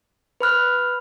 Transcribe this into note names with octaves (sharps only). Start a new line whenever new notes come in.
B4 B5 F6 F#6